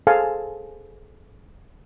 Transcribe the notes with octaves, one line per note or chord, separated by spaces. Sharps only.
G#4 A4 C5 F5 G#5 A5